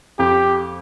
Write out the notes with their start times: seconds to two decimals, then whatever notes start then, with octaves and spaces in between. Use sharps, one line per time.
0.19 F2 G4